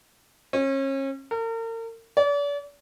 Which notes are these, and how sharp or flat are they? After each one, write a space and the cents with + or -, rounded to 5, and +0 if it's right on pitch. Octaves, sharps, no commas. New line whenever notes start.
C#4 -35
A#4 -40
D5 -40